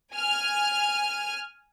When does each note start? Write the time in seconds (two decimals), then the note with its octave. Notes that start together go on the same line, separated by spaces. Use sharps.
0.14 G#5 F6